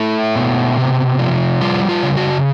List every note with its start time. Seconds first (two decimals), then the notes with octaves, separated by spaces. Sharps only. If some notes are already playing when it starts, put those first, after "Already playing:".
Already playing: A3 E4
0.36 B2
0.77 C3
1.19 F3
1.61 G3 F4
1.89 F4
2.03 C#3
2.17 F#4